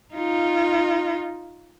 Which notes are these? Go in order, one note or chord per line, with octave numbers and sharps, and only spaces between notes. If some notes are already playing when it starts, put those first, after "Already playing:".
D#4 F4